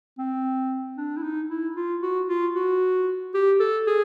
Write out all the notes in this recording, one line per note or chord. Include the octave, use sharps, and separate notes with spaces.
C4
D4
E4
D#4
E4
F4
F#4
F4
F#4
G4
A4
G#4